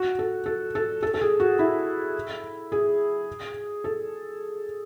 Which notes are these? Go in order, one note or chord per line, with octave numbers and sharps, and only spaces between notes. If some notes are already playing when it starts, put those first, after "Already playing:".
Already playing: F#4
A4
A4
A4
A4
A4
G#4
F#4
E4
G#4
A4